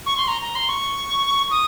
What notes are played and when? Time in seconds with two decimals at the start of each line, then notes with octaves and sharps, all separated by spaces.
0.06 C#6
0.17 C6
0.28 A#5
0.42 A#5
0.55 C6
0.69 C#6
1.51 D#6